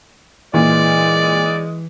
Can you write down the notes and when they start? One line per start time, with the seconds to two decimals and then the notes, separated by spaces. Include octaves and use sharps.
0.54 A#2 E3 G#3 D5